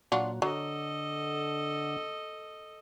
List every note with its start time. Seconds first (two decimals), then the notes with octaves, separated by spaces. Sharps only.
0.12 A#2 F#3 D4 F4 F#4
0.42 D3 F#3 A4 D#5